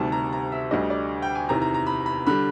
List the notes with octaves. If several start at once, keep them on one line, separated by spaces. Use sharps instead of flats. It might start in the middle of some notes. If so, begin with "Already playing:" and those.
Already playing: D2 C3 D#3 G3 A5
A#5
A#5
E5
D2 D3 G3 D#5
D5
G5
G#5
E2 C3 D#3 A#5
A#5
A#5
B5
B5
D3 G3 B5